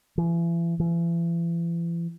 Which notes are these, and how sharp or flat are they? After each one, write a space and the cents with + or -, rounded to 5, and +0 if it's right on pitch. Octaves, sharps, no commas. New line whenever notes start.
E3 +40
E3 +40